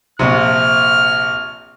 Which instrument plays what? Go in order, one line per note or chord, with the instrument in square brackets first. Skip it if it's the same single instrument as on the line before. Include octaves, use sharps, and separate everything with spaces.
[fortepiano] A#1 C3 [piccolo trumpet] F6